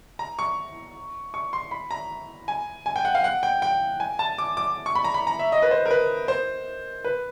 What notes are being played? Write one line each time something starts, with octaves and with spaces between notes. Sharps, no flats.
A#5
C#6
C#6
C6
B5
A#5
G#5
G#5
G5
F#5
F5
F#5
G5
G5
G#5
A5
D6
D6
C#6
B5
A#5
B5
A#5
E5
D#5
B4
C5
A#4
B4
C5
B4